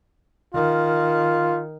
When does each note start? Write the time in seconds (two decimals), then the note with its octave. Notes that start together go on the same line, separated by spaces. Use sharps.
0.54 D#3 F4